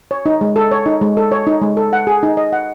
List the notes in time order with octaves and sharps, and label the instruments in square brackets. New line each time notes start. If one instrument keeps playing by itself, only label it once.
[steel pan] C#5
D#4
G#3
A4
C#5
D#4
G#3
A4
C#5
D#4
G#3
A4
F#5
G#4
D#4
D#5
F#5